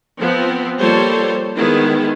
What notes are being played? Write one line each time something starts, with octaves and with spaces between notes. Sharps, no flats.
F3 B3 C4
F3 G3 A#3 A4 C5 C#5
D#3 G#3 B3 E4 G#4